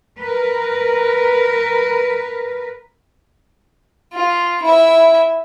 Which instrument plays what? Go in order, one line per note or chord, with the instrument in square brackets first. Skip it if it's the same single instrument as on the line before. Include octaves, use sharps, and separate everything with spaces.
[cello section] A#4 B4
[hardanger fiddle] F4
E4 E5